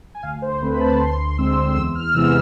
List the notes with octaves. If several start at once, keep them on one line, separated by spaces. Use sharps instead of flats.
G#5
D2 F5
C5
D3 A3 C4 B4
B5
A5
D2 C6
D3 G#3 C4 E6
E2 E6
F6
C3 E3 G#3 B3 E6